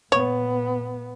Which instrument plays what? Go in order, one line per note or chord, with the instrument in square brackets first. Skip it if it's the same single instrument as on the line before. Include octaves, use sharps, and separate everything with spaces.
[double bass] A#2 B3 [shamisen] C#5